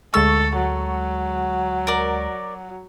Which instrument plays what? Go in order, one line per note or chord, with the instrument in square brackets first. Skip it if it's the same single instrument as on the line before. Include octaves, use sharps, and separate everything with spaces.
[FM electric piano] D2 G#3 C#6 [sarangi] A4 [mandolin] E6
[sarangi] F#3
[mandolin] A#4 D5